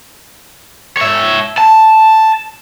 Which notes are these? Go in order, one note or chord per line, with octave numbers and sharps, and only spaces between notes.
C#5 E5
A5